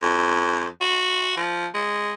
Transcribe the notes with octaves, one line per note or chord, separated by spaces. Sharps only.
F2
F#4
F3
G#3